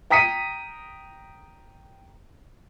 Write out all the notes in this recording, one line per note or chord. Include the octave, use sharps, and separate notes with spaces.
G5 A#5 D#6 B6 C#7 D#7